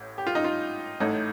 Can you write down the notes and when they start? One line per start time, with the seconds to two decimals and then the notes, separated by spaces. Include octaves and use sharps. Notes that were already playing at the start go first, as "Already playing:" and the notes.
Already playing: A1 A2
0.18 G4
0.27 F4
0.35 D#4
0.44 F4
1.00 A1 A2 A3 D#4